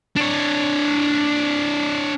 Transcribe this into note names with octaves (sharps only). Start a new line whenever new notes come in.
D4 C#5